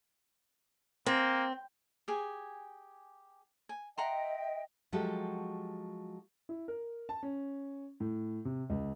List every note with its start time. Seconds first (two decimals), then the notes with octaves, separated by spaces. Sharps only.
1.06 A#3 C4
2.08 G4 G#4 G#5
3.69 G#5
3.98 D#5 E5 F#5 G5 A#5 C6
4.92 F3 F#3 G#3 F#4 G4 A4
6.49 E4
6.68 A#4
7.09 A5
7.23 C#4
8.00 A2
8.45 C3
8.70 C#2